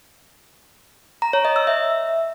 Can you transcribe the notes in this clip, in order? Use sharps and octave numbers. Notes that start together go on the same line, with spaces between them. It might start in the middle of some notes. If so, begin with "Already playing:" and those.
A#5
C#5
D#5
E6
E5